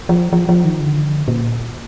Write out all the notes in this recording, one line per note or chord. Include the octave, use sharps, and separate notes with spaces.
F3
F3
F3
D#3
D3
A#2